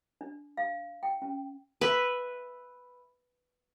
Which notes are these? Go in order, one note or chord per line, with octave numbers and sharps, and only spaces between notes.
D4
F5
G5
C#4
B4 E5 B5